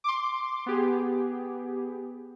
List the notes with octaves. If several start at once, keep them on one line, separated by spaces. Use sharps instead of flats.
C6 D6
B3 G4 G#4